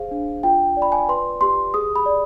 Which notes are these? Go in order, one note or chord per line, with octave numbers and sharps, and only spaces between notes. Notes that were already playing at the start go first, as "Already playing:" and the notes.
Already playing: G#4 C5 F5
D4
F4 G5
D5
B5
G#5
B4 C6
G4 C6
G#4 D#6
B5
D5